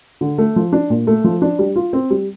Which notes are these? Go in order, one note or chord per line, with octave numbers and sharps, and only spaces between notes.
D3
A3
F3
D4
A#2
A3
F3
D4
G3
F4
C4
G3